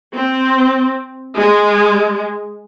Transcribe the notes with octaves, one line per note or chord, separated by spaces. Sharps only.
C4
G#3